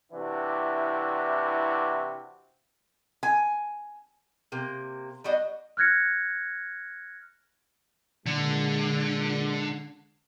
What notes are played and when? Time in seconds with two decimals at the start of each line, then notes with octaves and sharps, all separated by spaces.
0.13 C3 E3 D4 E4 F#4
3.23 G#5
4.52 C3 A#3
5.24 G3 D4 F#4 D#5
5.77 F6 F#6 G#6 A#6 C#7
8.26 A#2 D3 G#3